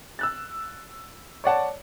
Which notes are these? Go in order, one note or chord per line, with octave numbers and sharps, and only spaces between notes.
E6 F#6 A6
C#5 D5 F#5 A5